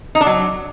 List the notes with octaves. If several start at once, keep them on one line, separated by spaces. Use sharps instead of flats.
D#4
D4
F#3